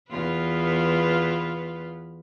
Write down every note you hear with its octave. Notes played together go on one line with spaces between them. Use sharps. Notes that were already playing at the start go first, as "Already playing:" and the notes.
E2 F4 B4